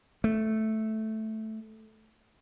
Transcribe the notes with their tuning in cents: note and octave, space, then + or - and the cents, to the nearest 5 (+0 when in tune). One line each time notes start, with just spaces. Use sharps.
A3 -5